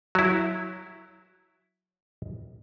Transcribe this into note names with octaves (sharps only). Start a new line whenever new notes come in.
F#3 E4